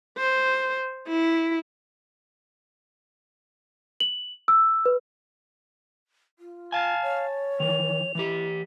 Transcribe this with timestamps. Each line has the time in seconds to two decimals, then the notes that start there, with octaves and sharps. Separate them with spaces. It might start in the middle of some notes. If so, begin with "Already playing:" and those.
0.18 C5
1.08 E4
4.00 F#7
4.48 E6
4.86 B4
6.39 F4
6.72 F5 G#5 A5
7.02 C#5
7.60 D#3 E3 F7
8.15 E3 E4 G4